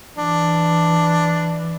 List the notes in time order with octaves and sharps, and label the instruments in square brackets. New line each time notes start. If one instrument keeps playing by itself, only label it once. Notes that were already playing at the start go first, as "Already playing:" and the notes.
[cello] E3 [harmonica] D4